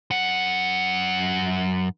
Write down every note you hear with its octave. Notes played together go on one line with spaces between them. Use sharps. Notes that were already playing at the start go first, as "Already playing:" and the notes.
F#2 F#5